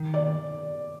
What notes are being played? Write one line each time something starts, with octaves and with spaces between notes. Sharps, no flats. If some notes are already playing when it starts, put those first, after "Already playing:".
Already playing: D#3
D5